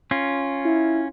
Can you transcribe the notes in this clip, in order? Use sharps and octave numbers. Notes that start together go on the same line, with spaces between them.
C#4 F4
E4